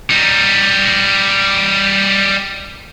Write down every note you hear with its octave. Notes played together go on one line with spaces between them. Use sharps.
G3 D#4